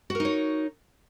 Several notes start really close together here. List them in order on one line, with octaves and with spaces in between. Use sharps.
F#4 A#4 D#4 C#5